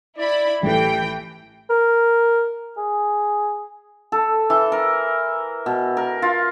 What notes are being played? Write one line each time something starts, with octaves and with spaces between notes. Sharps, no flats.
E4 D5 B5
A1 E3 G4 A4 G5
A#4
G#4
A4
E3
A#4
B2
A#4
F4